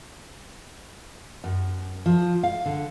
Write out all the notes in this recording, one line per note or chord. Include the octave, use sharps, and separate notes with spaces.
F#2
F3
F5
D3